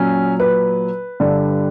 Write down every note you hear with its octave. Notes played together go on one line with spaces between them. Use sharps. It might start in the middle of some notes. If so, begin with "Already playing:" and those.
Already playing: A#2 F#3 C#4
B4
G2 D3 G3